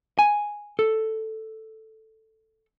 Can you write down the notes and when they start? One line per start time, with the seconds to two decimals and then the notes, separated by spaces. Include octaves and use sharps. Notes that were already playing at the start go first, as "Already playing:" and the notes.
0.19 G#5
0.79 A4